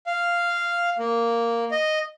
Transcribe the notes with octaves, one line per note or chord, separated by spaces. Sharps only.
F5
A#3
D#5